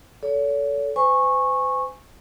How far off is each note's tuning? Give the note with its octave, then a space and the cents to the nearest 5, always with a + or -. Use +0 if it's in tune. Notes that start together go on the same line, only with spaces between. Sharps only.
A4 +0 C#5 +40
C5 -45 G#5 -10 C#6 -15